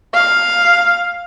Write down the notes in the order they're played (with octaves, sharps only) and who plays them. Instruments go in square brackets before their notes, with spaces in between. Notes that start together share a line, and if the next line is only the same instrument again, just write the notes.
[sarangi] F5